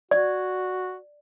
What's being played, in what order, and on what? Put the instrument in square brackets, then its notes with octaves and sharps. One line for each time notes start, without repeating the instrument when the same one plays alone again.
[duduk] F#4 [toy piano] D5